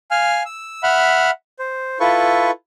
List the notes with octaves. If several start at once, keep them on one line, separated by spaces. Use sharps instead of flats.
F5 G#5 F6
E6
E5 F#5 B5 F6
C5
E4 F4 A4 B4 C#6